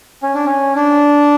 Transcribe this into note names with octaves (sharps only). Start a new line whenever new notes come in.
C#4
D4
C#4
D4